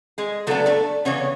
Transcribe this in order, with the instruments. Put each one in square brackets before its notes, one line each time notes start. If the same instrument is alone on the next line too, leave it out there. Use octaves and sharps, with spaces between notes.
[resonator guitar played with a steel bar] G#3 G#4
C#3 F#3 A3 B3 D4 A4
A3 A4
C#3 E3 B3 C#4 C#5